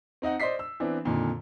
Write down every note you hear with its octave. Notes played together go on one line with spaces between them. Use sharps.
C4 D#4 D#5 F#5
C5 D5 D#5 B6 C7
E6
E3 B3 C4 D4
F2 A#2 D3 D#3